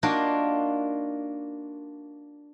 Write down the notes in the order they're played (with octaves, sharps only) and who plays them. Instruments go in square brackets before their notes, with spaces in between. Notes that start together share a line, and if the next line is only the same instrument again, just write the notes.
[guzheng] A#3 D4 D#4 F4 F#4